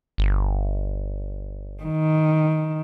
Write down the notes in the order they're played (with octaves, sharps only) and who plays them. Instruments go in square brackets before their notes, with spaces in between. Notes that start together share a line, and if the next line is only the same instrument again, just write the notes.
[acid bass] G1
[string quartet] D#3